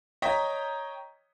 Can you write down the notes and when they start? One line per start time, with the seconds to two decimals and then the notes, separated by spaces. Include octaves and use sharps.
0.22 C#5 D#5 G5 A#5 B6